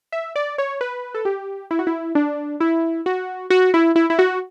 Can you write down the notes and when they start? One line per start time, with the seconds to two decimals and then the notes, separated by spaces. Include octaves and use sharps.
0.12 E5
0.36 D5
0.58 C#5
0.81 B4
1.14 A4
1.25 G4
1.71 E4
1.79 F#4
1.87 E4
2.15 D4
2.60 E4
3.06 F#4
3.50 F#4
3.74 E4
3.96 E4
4.10 E4
4.19 F#4